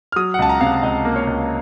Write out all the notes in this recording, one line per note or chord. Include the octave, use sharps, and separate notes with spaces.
F6
F#3 D#6
F#5
C#2 A5
A#5
C3 F5
F#5
C#2 D#5
A#3
C#5
C#2